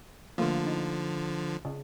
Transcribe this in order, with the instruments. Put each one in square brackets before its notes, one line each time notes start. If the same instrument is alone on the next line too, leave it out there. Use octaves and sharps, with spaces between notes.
[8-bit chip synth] D3 F3 [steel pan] A3 A#3 F4
[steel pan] D#4
C#3